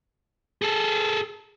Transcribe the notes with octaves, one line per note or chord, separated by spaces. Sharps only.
G#4 A4